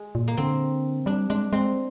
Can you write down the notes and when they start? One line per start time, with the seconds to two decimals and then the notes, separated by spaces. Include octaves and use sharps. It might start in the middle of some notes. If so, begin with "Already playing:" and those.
Already playing: G#3
0.15 A#2
0.28 A#3
0.37 D3 C4
1.06 G3 D4
1.30 G#3 D4
1.53 G#3 C4